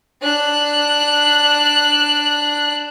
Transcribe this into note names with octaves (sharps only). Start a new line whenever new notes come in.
D4 F#6